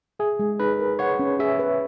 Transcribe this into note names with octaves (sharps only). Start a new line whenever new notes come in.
G#4 E5
G#3
D#4 B4
A#4
C#5 F#5
C#4
G#4 E5
B4